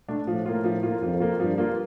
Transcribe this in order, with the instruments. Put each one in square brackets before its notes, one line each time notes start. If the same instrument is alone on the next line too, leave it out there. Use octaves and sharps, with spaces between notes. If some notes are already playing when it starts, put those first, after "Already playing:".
[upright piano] A3 D4
[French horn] A2 [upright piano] F3
[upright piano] A#3 F4
F3
A#3 F4
[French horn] F2 [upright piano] F3
[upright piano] A#3 F4
[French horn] G2 [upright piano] F3
[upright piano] A#3 F4